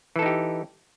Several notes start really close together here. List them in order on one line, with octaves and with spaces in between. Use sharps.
E3 A4 D#4 G4